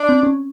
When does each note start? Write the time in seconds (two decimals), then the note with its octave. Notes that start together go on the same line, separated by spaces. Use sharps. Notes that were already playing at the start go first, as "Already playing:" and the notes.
Already playing: D4
0.09 C4
0.23 C#4